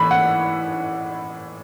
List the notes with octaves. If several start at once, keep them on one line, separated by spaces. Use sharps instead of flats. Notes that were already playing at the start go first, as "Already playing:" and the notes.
Already playing: A2 E3 B5
F#5